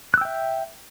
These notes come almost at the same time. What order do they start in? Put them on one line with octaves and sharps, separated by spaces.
F#6 E6 G5 E5